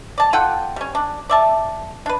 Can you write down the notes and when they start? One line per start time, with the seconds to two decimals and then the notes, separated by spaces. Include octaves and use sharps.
0.18 D5 A5
0.33 F4 A4 F#5 G5
0.76 G3 C#4
0.95 D4
1.29 D5 E5 A5
2.06 D4 B4